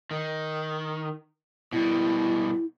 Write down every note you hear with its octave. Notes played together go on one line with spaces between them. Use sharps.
D#3
B2 G3 E4